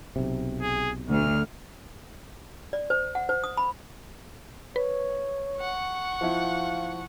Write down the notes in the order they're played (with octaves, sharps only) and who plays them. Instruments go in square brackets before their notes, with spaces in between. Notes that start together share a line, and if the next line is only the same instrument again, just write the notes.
[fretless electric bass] B1 C3
[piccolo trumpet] G#4
[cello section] D2 [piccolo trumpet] F6
[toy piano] D5
C5
F#5
C5
D#6
B5
[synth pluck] B4 [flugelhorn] C#5
[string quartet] F#5 C#6
[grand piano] F3 E4 [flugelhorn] F5